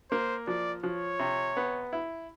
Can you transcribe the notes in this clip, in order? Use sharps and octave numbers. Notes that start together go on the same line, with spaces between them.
A#3 C5
F3 D5
F3 C#5
C3
B3
E4